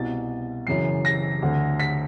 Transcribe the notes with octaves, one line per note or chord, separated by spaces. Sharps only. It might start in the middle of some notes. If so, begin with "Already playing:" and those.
Already playing: C2 B2 A6
F#2 C#3 E3 C7
A#6
D2 D3
B6